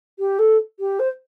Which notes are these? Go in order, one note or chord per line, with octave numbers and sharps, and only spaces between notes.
G4
A4
G4
C5